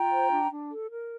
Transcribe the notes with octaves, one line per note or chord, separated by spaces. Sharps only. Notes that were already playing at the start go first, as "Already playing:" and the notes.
Already playing: F4 G5 A#5
C5
D4
D4
A4
A#4